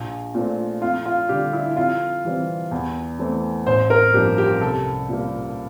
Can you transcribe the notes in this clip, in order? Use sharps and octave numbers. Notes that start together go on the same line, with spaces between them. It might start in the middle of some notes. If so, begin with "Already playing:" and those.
Already playing: A#1
A#2 A3 C4
F2 F4
F4
D3 G3 G4
E4
F2 F4
E3 G3 C4
E2
E3 A3 C4
A1 C5
A#4
G2 F3 A#3 G4
G4
C2 A4
A#2 G3 A#3